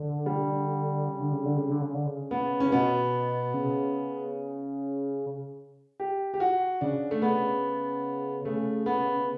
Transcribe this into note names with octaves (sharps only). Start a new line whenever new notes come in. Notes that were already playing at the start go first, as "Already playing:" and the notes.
Already playing: D3
G3
C#3
D3
C#3
D3
C#3
D3
C#3
D3
C#3
B3
C#4
C#3
B2 B3
C#3
G4
G4
F#4
C#3 D4
A3
B3
C#3 A3
B3